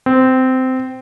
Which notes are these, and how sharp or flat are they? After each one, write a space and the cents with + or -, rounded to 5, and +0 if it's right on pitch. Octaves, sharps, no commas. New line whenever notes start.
C4 -15